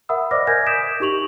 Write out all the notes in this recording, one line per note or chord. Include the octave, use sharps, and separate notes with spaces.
A#4 E5 F#5 B5 D#6 E6
C5 D5 D#5 D6 F6 A#6
A#4 G#5 G6 G#6 A#6
D6 D#6 G6 B6 D7 E7
D#4 G4 C#6 F7 F#7